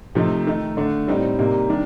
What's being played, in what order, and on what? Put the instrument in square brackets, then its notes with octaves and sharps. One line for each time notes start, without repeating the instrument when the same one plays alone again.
[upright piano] C3 F3 A3 D#4
D#3 A3 D#4
D3 A3 D4
A2 G3 C4 D#4
C3 G3 A#3 D#4
D#3 G3 D4